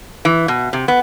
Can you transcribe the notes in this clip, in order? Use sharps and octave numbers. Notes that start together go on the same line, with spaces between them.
E3
B2
C3
B3